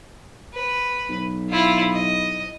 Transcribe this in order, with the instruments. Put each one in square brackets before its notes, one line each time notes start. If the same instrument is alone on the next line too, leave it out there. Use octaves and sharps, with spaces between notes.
[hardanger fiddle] B4
[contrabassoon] B1
[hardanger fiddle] E4 F4
D#5